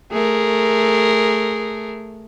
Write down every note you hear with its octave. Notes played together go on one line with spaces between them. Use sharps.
A3 G#4 A#4